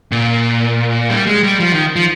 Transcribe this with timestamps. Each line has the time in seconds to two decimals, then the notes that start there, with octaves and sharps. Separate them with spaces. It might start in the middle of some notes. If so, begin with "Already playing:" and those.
0.12 A#2
1.10 G3
1.27 G#3
1.43 G3
1.60 F3
1.72 D#3
1.96 F3